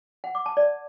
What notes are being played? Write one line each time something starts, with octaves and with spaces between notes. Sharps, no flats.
F#5
D6
A5
D5